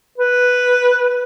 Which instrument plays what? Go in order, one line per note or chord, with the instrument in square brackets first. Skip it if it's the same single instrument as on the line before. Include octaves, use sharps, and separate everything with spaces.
[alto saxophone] B4